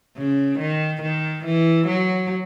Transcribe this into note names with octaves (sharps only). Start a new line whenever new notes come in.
C#3
D#3
D#3
E3
F#3